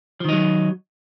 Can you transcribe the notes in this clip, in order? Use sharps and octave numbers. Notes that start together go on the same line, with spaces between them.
D#3 F3 F#3 D#4